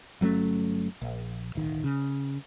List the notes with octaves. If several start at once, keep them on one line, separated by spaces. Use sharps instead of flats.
G1 F#3 A3 C#4
A#1
D1 B1 D#3
C#3